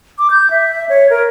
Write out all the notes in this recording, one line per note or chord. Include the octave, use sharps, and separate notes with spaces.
D6
G6
E5
C#5
A#4